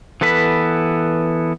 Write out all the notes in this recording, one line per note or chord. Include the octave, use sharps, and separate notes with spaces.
E3 B3 A4 B4 B5